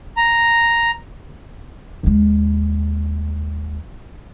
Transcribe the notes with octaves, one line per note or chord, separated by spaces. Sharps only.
A#5
D#2 G#3